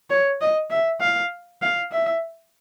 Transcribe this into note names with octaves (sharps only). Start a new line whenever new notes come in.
C#5
D#5
E5
F5
F5
E5